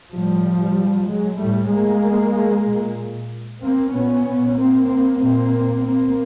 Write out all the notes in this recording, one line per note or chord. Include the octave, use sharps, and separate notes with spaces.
A2 F3 G3
F#3 G#3
A2 G3 A3
G#3 A#3
A#2
A#3 C4
A#2 B3 C#4
A#3 C4
A#3 C4
A#2 A#3 C4
A#3 C4